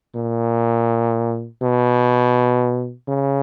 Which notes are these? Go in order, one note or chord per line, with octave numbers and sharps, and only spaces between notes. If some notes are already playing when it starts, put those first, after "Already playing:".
A#2
B2
C#3